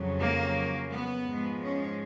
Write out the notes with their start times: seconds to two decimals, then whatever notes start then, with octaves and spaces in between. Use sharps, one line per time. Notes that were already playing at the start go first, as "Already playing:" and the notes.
Already playing: F2 C#3 F#3
0.21 A#3
0.92 B3
1.27 G#2 F3 G#3
1.62 C#4